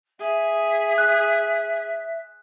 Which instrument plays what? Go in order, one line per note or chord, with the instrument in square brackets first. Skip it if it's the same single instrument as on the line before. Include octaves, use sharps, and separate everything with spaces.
[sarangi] G#4 [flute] E5
[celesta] F#6